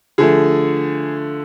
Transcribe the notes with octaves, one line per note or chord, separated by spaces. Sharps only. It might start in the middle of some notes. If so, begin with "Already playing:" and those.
D3 F3 A3 G#4